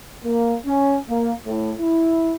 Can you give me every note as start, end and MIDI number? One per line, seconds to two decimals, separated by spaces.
0.24 0.55 58
0.66 0.97 61
1.08 1.32 58
1.46 1.72 45
1.79 2.35 64